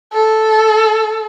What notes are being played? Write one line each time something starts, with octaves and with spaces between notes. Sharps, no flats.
A4